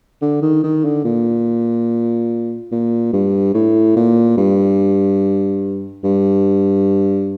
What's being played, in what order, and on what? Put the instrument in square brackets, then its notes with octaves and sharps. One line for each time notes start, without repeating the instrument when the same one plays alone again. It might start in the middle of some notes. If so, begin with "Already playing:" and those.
[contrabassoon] D3
D#3
D#3
D3
A#2
A#2
G2
A2
A#2
G2
G2